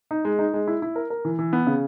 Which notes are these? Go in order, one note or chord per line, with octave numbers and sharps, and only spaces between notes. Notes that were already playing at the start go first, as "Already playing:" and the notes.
D#4
G#3
D#4
G#3
E4
E4
A#4
A#4
E3
E3
B3
C#3